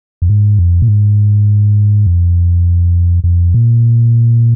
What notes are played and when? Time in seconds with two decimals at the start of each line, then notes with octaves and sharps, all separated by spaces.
0.22 F2
0.30 G#2
0.59 F2
0.82 A#2
0.88 G#2
2.07 F2
3.24 F2
3.54 A#2